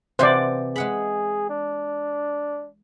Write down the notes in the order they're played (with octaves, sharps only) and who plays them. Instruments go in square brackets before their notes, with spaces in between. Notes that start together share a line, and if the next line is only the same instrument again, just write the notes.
[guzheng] C3 E3 F#4 [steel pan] C5 D5
[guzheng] G#3 F#5 B5 [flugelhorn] G#4
[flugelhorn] D4